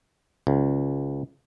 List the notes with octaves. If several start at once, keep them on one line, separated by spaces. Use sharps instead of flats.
C#2